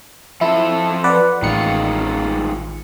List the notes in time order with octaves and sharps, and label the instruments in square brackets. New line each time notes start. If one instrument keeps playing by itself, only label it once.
[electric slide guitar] F3 A4 [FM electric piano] E4
[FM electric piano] B4 D5 F#5
[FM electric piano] A1 C#7 [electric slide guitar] D#3 G#3 F4